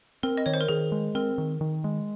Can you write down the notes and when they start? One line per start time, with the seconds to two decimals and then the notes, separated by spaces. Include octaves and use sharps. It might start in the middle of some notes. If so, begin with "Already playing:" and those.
0.23 C4 A#4
0.37 D#5
0.46 D#3 C#5
0.54 C5
0.61 A#4
0.68 D#3 G#4
0.92 G#3
1.15 C4 A#4
1.38 D#3
1.61 D#3
1.84 G#3